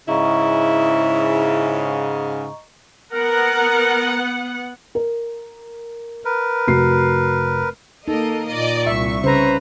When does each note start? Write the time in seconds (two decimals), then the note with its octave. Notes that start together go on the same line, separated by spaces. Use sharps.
0.08 G#2 C#3 E4 D#5 A#5 C#6
3.12 B3 A#4 F#5
4.95 A#4
6.25 A#4 B4
6.67 F1 F#4 C7
8.08 A#3 D#4 A4 A#4 D#5
8.47 A#2 D5 D#5
8.87 C2 E5 C#6
9.24 C#3 B4 C5 A#5